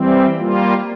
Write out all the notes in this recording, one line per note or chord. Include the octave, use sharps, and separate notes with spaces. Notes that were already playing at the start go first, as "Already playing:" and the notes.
Already playing: E3 G3 C4
G3 A#3 F4